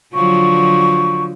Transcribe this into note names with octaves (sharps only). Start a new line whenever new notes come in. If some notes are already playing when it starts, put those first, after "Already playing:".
D3 F3 F#3 C#6